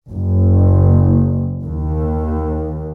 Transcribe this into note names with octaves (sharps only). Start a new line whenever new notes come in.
F#1
D#2